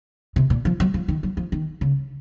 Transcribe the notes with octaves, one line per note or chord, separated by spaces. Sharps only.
C3
A#2
F3
F#3
F3
D#3
F#3
F3
D#3
C#3